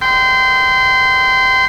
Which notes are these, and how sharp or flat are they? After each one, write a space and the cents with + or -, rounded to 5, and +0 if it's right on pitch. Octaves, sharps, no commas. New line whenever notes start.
G5 -15 C6 -30